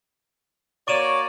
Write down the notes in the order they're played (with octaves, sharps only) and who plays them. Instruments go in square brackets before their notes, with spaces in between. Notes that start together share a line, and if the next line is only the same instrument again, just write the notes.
[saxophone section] A#3 F#4 D5 [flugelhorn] C#5 [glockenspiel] C#6 D#7 E7